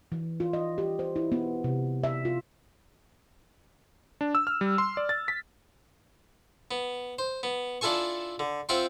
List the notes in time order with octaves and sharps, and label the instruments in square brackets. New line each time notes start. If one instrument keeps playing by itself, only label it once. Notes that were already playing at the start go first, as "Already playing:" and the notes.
[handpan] E3
F4
D#5
G4
C5
E4
B3
C3
E5
F4
[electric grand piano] D4
E6
F6
G3
C6
D5
A6
B6
[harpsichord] B3
C5
B3
D4 E4 F4 A4 G#5 C#6
D3
C4 F4 E5 F#5 G5 C6